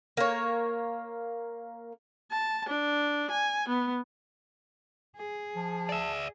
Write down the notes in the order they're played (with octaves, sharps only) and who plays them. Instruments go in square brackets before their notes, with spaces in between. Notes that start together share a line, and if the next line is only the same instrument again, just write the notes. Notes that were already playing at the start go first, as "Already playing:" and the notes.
[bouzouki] A#3 C#5
[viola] A5
D4
G#5
B3
[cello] G#4
[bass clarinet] F3 [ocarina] A5
[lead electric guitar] D5 E5